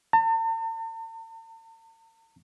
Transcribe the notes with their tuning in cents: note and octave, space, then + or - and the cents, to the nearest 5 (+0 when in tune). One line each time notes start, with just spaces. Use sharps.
A5 +45